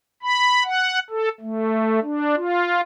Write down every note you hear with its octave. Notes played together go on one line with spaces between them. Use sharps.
B5
F#5
A4
A3
D4
F4